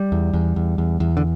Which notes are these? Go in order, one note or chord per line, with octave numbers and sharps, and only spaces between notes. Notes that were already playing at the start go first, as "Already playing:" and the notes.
Already playing: G3
E2
E2
E2
E2
E2
D3